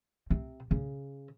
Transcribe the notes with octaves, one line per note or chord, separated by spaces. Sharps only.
C3
C#3